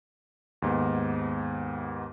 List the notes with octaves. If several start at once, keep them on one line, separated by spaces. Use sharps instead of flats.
D#2 G#2 B3